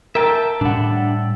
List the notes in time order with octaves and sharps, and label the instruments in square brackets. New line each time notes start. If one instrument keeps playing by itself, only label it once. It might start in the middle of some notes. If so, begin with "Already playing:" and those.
[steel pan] A#4 [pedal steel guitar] E5 G5 A5
[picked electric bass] A2 G3 [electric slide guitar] D4 F#5